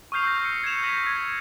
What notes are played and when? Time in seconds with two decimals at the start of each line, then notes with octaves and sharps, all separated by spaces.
0.12 C#6 D#6 F6 G6 C7 F7
0.23 E6 G6 A#6
0.42 C7 C#7
0.64 G#6 C#7 E7 F7
0.83 E6 G6 A#6 B6 D#7
1.07 G#6 C7